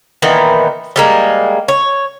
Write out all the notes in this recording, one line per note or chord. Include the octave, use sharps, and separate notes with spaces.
A#2 D#3 E3 B3
G3 G#3 A#3
C#5